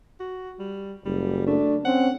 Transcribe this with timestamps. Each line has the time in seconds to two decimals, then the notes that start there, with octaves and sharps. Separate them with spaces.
0.20 F#4
0.59 G3
1.05 F#1 G3
1.47 A3 D4
1.85 C4 C#4 F#5